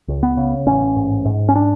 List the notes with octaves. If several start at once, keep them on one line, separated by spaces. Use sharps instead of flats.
C#2
B3
C#3
A1 C#4
G#2
G#2
C#4
D4